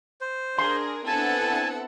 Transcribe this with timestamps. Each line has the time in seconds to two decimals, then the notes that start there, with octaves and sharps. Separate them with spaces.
0.21 C5
0.59 D4 G#4 A#4 C6
1.07 B3 C4 D4 E4 A4 F#5 G#5 A5